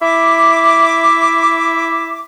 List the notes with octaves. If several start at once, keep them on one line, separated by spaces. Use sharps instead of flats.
E4 E5 D6